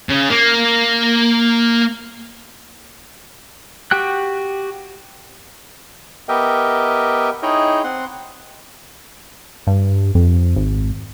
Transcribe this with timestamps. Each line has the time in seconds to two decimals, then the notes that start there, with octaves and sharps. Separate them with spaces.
0.09 C#3
0.30 A#3
3.91 F#4 G4 G5 F#6
6.29 B3 G4 A#4 D#5 E5 G5
7.43 D#4 E4 G#4 C#5 D#5 G5
7.84 C4 F#5 C6
9.67 G2
10.15 F2
10.56 G#1